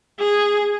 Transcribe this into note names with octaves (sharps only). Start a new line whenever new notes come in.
G#4